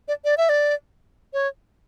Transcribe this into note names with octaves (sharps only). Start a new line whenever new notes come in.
D5
D5
E5
D5
C#5